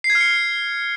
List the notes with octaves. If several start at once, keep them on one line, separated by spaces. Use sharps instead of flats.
C7
G#6
F6
C#7